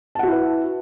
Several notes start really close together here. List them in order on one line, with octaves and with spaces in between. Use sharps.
A5 F#5 F#4 E4 B4